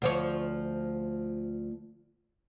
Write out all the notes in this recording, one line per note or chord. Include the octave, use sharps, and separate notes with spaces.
D2 F3 C#5